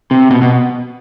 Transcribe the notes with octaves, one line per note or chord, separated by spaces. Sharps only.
C3
B2
B2